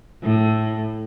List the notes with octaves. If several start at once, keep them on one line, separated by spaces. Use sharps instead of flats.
A2